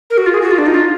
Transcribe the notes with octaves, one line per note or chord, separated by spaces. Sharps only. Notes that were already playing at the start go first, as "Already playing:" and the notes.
A#4
F#4
F4
G#4
F#4
F4
D4
D#4
F4